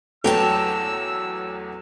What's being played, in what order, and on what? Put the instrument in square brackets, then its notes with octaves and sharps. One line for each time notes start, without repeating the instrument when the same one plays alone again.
[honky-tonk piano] E2 F#3 A3 [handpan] A4 [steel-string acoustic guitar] C#5 G5 A5 [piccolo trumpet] E6